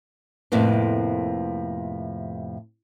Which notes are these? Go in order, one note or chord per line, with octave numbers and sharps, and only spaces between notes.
F2 A2 C3 A#3 B3